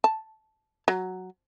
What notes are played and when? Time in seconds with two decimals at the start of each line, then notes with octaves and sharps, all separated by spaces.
0.04 A5
0.88 F#3